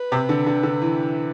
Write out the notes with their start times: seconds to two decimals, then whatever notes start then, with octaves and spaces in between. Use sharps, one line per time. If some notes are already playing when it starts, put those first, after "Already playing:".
Already playing: B4
0.12 C3
0.29 D3
0.46 D3
0.63 D3
0.82 E3